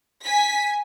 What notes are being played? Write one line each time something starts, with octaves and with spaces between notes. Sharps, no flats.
G#5 B6